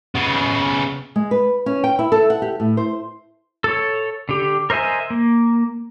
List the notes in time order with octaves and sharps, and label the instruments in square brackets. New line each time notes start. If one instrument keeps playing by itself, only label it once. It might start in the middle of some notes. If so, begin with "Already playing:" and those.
[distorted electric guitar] C#3 B3
[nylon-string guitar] G#3
B4
C#4
G5
E4
A4
F#5
G4
A2
C5
[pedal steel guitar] A4 C#5
D3 G4
A#4 C5 D#5 E5 G#5
A#3